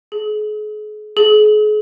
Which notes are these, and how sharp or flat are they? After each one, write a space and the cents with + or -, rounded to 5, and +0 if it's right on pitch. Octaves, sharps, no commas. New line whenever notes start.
G#4 +40
G#4 +40